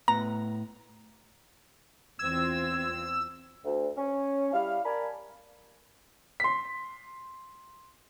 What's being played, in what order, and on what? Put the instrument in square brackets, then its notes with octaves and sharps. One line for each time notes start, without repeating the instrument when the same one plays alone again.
[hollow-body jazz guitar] A2 B3 [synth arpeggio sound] A#5
[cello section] E2 C4 F4 [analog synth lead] E6 [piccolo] G#6
[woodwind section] D2
C#4
G3 E4 F5
A#4 D5 G#5 A5 B5
[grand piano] C6 B6